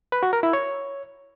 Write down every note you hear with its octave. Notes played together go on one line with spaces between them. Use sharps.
B4
F#4
A#4
E4
C#5